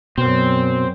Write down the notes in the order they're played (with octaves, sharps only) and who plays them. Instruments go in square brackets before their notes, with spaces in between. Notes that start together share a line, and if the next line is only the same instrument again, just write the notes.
[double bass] F#2 F#3 [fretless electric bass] B2 [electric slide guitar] C4